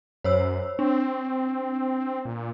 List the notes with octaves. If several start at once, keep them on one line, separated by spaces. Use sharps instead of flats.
F#2 C5 C#5 E6
C4 D4
A#2